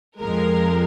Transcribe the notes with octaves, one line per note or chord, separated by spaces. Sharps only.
F2 F3 G#3 A#4